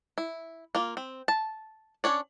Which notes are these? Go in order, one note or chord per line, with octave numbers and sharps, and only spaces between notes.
E4
A#3 F4
C4
A5
C#4 D4 C#5 D5